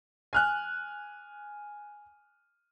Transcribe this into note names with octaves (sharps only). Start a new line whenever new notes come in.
G#5 F6 F#6